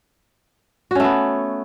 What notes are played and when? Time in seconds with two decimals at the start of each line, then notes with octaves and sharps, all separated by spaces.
0.91 F#4
0.95 C#4
1.00 A3
1.04 B3